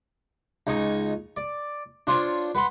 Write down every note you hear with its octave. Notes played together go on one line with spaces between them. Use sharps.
C#2 D#4 G#5 C#6 D#6
D5
D4 F4 C5 C#5
B4 F#5 B5 C6